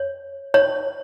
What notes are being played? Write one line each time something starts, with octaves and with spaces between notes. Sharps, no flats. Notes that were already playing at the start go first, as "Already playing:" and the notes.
Already playing: C#5
C#5